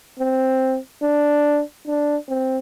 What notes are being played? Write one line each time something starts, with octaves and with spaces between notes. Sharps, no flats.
C4
D4
D4
C4